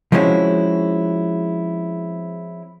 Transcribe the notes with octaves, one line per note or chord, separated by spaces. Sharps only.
F3 G#3 C4 C#4 E4 F#4